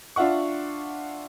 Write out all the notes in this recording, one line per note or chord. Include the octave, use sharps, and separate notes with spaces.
D4 F4 E5 F#5 C#6